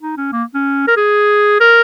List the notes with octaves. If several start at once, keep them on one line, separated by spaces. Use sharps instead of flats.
D#4
C#4
A#3
C#4
A#4
G#4
A#4